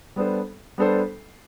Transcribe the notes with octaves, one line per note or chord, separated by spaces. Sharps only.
G3 B3 D4 A4 C5
G3 B3 D4 A4 C5